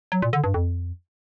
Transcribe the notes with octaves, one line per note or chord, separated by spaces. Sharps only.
F#3
A#2
D3
G2
F2